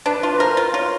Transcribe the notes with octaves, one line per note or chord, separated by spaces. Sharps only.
D4 B4
F4
B4
A#4 C5
F4
F4 C#5